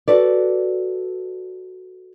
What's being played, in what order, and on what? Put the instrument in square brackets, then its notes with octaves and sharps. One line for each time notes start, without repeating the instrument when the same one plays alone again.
[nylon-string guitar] F#4 A4 B4 D5